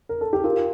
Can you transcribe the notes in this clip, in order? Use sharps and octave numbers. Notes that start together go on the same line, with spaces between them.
A#4
A4
G4
F4 A#4